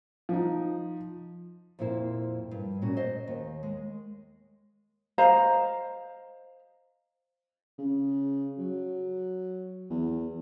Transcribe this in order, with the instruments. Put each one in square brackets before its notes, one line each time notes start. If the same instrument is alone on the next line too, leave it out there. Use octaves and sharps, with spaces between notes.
[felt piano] F3 D#4
[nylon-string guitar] F2 A#2 A#3 E4 C5
G2
A#2 C#4 F#4
C5 D#5
D#2
G#3
[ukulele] C5 D#5 F5 A#5
[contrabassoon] C#3
F#3
E2